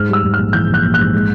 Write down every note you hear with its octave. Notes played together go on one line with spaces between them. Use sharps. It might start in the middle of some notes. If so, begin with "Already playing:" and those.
Already playing: G#2 F6
G3 E6
G#2
A#1 F6
E3 G6
A#1
F#6
A#1
G#2 F#6
G#3